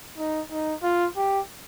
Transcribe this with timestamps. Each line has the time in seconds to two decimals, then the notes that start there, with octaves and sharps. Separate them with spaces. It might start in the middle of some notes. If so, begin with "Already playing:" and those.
0.18 D#4
0.51 D#4
0.83 F4
1.16 G4